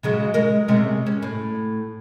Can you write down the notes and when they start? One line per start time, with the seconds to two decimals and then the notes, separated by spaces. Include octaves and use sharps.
0.03 C#3 F#3 G#3
0.34 G#3 A#4
0.68 C3 G#3 C#4
1.07 C#4
1.22 A2